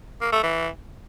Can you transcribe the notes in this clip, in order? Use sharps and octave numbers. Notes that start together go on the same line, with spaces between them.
A#3
A3
E3